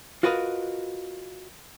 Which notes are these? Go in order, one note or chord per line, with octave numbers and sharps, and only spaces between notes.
F4 F#4 A#4 B4 D#5 F5